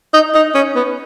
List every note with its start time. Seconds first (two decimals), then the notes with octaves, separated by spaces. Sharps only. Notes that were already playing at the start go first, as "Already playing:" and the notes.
0.13 D#4
0.35 D#4
0.55 C#4
0.76 B3